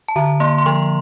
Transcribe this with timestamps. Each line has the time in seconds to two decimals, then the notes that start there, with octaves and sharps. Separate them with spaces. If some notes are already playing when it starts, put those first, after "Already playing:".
0.08 A5
0.16 D3 A#5
0.40 A#3 C6
0.58 C6
0.66 F3 C#6